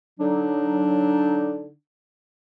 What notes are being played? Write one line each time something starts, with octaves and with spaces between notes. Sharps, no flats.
D3 F#3 D4 D#4